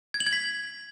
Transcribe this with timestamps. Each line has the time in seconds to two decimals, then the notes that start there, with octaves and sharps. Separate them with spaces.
0.14 G#6
0.20 F#7
0.27 G#6
0.33 B6